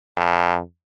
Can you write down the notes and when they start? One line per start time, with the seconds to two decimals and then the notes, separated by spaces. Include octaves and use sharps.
0.17 F2